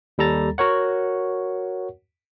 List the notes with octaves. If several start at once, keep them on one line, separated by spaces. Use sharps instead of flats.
D#2 G3 A4 A#5 A6
F#4 A#4 C#5 F#5